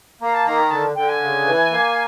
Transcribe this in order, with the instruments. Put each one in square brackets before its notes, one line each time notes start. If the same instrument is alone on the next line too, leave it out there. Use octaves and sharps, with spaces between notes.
[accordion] A#3 [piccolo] A#5
[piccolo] A5
[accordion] D#3 [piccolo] A#5
[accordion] D3 [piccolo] A5
[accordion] D3 [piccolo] G5
[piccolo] G#5
[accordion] C#3
E3
A#3